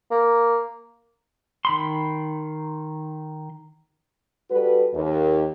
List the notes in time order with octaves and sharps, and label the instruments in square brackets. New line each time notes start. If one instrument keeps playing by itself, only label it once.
[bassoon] A#3
[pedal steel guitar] D#3 B5 C6
[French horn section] G3 F#4 A4 B4
D#2